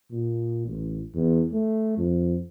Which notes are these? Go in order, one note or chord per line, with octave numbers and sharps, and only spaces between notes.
A#2
A1
E2
A3
F2